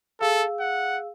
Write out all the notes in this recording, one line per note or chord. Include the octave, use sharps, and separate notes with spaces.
G#4 A4 F5 E6
F#5